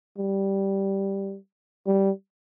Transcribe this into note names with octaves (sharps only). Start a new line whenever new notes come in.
G3
G3